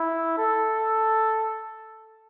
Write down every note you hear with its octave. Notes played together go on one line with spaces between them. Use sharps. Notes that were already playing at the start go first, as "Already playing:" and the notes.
Already playing: E4
A4